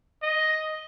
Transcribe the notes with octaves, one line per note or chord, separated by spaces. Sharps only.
D#5